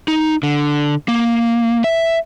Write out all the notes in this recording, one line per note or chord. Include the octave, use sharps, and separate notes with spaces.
D#4
D3
A#3
E5